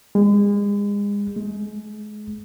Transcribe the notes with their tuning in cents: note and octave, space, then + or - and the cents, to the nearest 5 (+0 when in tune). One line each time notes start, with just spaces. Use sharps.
G#3 -35
G#3 +30